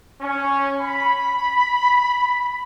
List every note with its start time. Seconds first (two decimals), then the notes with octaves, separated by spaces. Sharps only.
0.21 C#4
0.82 B5